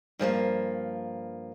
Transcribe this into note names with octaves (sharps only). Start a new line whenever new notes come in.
G2 F3 G3 A#3